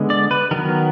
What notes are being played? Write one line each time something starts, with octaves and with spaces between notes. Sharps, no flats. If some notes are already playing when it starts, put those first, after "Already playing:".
Already playing: D3 G#3 B3
D5
B4
D#3 F#3 B3 A#4